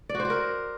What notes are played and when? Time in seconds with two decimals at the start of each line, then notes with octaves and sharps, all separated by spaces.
0.09 D5
0.15 F#4
0.20 C5
0.25 F#4
0.30 A#4